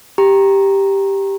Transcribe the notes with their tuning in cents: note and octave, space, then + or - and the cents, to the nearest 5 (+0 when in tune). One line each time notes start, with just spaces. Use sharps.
G4 +0 A#5 +0